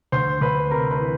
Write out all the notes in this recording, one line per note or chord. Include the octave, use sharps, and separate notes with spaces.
D2 C5 C6
D2 B4 B5
C3 A#4 A#5
B4 B5
E3